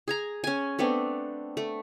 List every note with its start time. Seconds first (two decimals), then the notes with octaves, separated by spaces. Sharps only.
0.08 G#4 G#5 A#5
0.44 C#4 G#5
0.79 A3 B3 C4 D4
1.57 A3